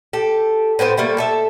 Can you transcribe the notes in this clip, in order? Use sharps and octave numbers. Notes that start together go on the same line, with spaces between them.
G4 A4
A2 B3 C4 C5
G3 A3 A#3
A4 E5